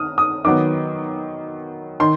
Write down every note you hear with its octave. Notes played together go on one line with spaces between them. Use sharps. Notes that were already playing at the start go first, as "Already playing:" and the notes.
Already playing: D#6 F6
D#6
D#3 F#3 B3 D6
D#3 C6